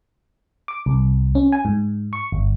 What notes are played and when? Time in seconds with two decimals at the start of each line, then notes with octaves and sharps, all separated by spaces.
0.68 D6
0.86 C2
1.35 C#4
1.52 G#5
1.65 G#2
2.13 C#6
2.32 G1